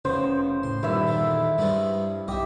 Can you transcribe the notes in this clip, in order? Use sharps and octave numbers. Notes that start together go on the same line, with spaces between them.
F1 C#3 B3 C#4 C5
A2 C6
G2 A#2 D#3 E4 E5
E2 D3
G2 G3 G#3 B3
B1 G4 D#5 E5